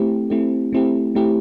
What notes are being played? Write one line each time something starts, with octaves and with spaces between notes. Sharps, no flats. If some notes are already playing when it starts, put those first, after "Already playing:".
Already playing: A3 C4 E4 G4
A3 C4 E4 G4
A3 C4 E4 G4
A3 C4 E4 G4